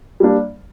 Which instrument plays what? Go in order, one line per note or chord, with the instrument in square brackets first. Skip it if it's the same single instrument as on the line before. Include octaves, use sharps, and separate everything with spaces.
[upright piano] G3 A#3 D4